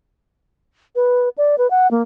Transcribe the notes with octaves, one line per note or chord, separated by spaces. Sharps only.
B4
D5
B4
F#5
A#3